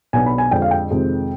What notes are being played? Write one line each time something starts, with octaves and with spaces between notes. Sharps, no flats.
B1 B2 B3 D4 G#5
B5
G#5
F2 D3 G#3 D4 G5
F5
G5
F2 C3 D#3 G#3 C4